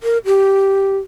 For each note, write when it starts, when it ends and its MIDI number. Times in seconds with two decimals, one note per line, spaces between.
0.03 0.18 70
0.25 0.98 67